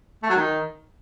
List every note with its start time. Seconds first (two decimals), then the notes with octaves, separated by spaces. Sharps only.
0.23 A3
0.29 F#3
0.36 D#3